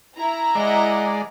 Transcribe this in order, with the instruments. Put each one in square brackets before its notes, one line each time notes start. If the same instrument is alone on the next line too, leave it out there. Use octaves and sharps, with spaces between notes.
[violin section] E4 A#5
[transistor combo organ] G#3 D5 [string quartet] D#5 F#5